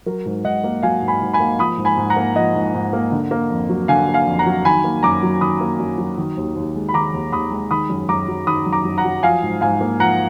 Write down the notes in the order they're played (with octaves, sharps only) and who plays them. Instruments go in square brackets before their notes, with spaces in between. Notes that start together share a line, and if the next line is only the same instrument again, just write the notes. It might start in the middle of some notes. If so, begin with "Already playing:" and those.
[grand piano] F#3 A#4
G#2
G#2 D#5 F#5
A#3
F#3 F5 G#5
G#2
G#5 B5
G#2
G#5 B5
A#3
F3 B5 D#6
G#2
G#5 B5
G#2
F#5 A#5
A#3
F3 D#5 F#5
G#2
G#2
A#3
D3
A#3
F2
F#3
D3 F5 G#5
A#3
F5 G#5
F2
F#5 A#5
F#3
D#3 G#5 B5
A#3
F#2 A#5 D6
F#3
D#3 B5 D#6
A#3
F#2
F#3
D#3
D#2
D#2
G#3
B5
D#3 A#5 D6
D#2
D#2 B5 D#6
G#3
D#3 B5 D#6
F#2
F#2 A#5 D6
F#3
D#3 B5 D#6
F#2
A#5 D6
F#2
F#5 A#5
F#3
F3 F5 G#5
G#2
G#2 F5 G#5
A#3
F3 F#5 A#5